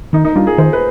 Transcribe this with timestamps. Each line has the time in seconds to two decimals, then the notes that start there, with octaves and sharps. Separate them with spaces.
0.13 D#3 D#4
0.25 D#4
0.36 G3 D4 F4
0.47 G#4
0.58 D#3 C5
0.73 B4